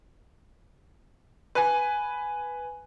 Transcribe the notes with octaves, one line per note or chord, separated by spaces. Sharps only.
B4 G#5